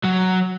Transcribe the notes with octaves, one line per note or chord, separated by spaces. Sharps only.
F#3